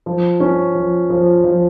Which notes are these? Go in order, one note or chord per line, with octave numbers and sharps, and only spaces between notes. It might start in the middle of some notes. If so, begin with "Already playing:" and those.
F3
C#4
F3
F3
F3